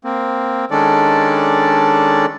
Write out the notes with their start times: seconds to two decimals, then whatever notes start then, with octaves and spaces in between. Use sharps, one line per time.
0.04 A#3 C4
0.71 D#3 G#3 C#4 D4 A4 D5